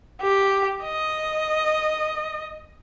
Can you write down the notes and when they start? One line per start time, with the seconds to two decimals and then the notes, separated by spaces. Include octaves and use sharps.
0.21 G4
0.84 D#5